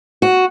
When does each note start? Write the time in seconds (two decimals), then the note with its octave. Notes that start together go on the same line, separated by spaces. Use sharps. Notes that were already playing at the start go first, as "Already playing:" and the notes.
0.22 F#4